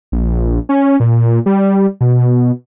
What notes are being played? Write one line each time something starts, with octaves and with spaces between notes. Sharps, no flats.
A#1
C#4
A#2
G3
B2